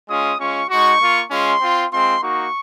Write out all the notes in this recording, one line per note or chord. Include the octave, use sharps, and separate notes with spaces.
G#3 C#4 F4 D#6
G#3 C#4 F4 C#6
G#3 D#4 F#4 C#6
A#3 F4
G#3 C#4 F4 C6
C4 F4
G#3 C4 F4 C6
A#3 D#4 F#4 C#6